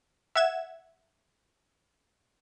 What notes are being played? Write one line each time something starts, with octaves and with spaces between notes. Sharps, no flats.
E5 F#5 G#6 E7